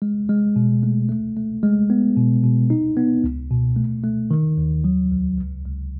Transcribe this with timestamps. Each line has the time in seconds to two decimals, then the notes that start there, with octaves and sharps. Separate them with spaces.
0.02 G#3
0.29 G#3
0.56 B2
0.83 A3
1.09 A3
1.37 A3
1.63 G#3
1.90 B3
2.17 B2
2.44 B2
2.70 D#4
2.97 B3
3.24 C#2
3.51 B2
3.77 A3
4.04 A3
4.31 D#3
4.58 D#2
4.84 F#3
5.11 C#2
5.38 C#2
5.65 C#2